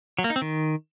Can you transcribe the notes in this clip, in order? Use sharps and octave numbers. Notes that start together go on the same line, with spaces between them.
F#3
A#3
D#4
C4
D#3